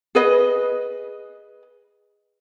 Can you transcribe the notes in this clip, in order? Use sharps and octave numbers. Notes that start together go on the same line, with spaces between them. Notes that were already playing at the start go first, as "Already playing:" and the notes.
G#4 B4 D#5